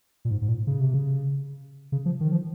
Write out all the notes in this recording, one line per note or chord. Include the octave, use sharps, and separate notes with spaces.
A#2
G#2
G#2
A#2
C#3
C3
C#3
C#3
F3
D#3
F3